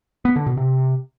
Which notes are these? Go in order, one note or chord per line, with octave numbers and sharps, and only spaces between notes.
B3
D3
B2
C3